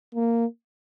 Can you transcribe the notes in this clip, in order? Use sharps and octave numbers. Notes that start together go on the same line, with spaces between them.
A#3